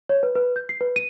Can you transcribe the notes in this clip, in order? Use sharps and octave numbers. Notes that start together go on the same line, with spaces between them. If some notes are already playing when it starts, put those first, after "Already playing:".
C#5
B4
B4
G6
C7
B4
D#7